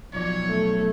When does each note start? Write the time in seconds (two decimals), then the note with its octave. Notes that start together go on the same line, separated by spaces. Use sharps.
0.13 B1 F3 F4 C#5
0.49 A3